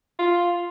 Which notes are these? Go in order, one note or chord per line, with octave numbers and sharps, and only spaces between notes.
F4